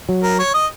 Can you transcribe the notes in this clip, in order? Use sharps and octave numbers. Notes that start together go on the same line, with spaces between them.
F#3
A#4
C#5
D#5